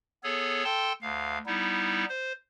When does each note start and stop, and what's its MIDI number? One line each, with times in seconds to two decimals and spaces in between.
0.24 0.64 59
0.24 0.64 68
0.24 0.64 69
0.24 0.64 73
0.64 0.93 69
0.64 0.93 79
0.64 0.93 81
0.64 0.93 84
1.02 1.38 38
1.02 1.38 77
1.46 2.05 55
1.46 2.05 59
1.46 2.05 63
1.46 2.05 64
2.09 2.33 72